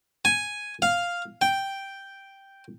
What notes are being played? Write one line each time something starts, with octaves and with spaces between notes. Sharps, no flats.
G#5
F5
G5